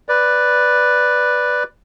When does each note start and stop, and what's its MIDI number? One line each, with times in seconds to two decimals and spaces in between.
0.09 1.63 71
0.09 1.63 74